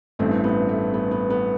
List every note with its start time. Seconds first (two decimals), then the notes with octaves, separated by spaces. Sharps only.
0.19 A1 G2 E3 A3 C4
0.44 B3
0.69 A3
0.94 B3
1.11 B3
1.30 B3